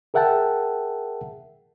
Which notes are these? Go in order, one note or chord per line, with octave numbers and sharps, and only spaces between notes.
G#4 A#4 E5 F#5 G5 A5